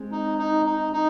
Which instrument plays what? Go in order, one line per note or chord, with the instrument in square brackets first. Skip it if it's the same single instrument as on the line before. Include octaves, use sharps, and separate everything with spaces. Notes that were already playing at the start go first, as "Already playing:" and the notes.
Already playing: [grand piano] G#3 C4
[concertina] D#4
D#4
D#4
D#4